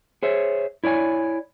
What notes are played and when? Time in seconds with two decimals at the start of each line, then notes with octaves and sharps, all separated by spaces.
0.23 G#4 C5 C#5 E5
0.84 E4 C#5 D5 G#5